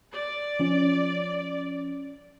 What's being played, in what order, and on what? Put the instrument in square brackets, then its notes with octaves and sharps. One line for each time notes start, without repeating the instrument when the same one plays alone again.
[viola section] D5
[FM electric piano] F3 C#4